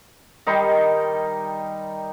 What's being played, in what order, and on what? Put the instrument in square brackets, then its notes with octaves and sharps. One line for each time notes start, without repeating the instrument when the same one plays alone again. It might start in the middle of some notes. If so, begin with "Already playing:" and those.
[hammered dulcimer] D#3 G3 D#4 C6